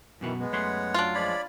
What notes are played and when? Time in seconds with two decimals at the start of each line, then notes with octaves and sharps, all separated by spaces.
0.21 F#2 B2 D#3 E3 F#4
0.40 G#3 B3
0.53 F#2 A3 C#5 F#5 C6
0.94 F#3 D4 F4
1.15 F3 G#3 C#5 D5 B5